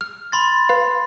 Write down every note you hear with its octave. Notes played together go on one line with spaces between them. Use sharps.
F6
B5 C6 A6
B4 F5